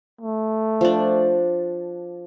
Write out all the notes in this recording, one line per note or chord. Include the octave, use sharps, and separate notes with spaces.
A3
F3 D4